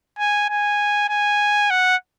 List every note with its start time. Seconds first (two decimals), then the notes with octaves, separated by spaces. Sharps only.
0.19 G#5
0.49 G#5
1.09 G#5
1.71 F#5